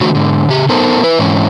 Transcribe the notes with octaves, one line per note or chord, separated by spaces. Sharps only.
D3 E3 F#3 A3 F#4
G#2 D3
C#3 G4
B3 D#4 A4 A#4 C5
E4 B4
G#2 E3 C#4